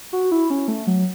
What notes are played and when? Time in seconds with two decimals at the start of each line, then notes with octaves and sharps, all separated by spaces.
0.13 F#4
0.32 E4
0.50 C#4
0.68 A3
0.87 F#3